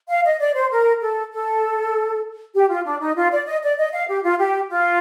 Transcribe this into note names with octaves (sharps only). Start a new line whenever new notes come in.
F5
D#5
D5
C5
A#4
A4
A4
G4
F4
D4
D#4
F4
D5
D#5
D5
D#5
F5
G4
F4
G4
F4